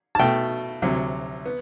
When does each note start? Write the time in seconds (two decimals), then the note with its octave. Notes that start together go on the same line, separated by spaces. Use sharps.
0.15 A5
0.19 B2 A3 G5
0.82 D2 C3 F#3
1.46 B3